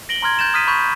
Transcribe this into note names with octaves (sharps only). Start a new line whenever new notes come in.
A#6 D7 F#7 G7
A#5 C6 F6 G#6
G6 A6 E7
D#6 F6 B6 D#7
B5 C#6 G6
G6